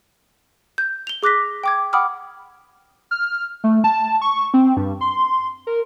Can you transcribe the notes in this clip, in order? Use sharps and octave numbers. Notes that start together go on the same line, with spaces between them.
G6
F7 G7
G#4 D6 F#6 A#6 B6
G5 D6 G#6
F#5 G5 B5 D6 D#6 F6
F6
A3
A5
C#6
C4
G2
C6
A#4